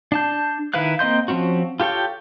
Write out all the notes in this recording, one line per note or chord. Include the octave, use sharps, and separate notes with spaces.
D4 A5 G6
D#3 E4 B4 F5 F#6
A#3 C4 D#5 C6 G6
F3 A#3 C4 C#4 F#4
F4 G4 A4 C#5 G5